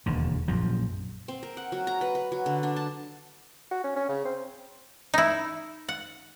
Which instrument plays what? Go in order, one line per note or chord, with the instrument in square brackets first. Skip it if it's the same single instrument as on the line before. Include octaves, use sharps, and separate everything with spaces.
[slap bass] E1 D#2 D3
A#1 F#2 A#2 F3
[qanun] C4
A#4
F#5
F#3
A#5
B4
B4
F#3
D3
D4
A5
[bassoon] F#4
C#4
C#4
C#3
C4
[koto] D#4 E4
F#5